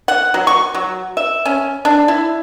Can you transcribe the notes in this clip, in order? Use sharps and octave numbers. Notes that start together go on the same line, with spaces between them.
F#5
F#3
C#6
F#3
E5
C#4
D4
E4